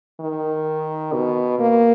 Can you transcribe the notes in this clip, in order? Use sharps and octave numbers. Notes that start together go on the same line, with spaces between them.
D#3
B2
A#3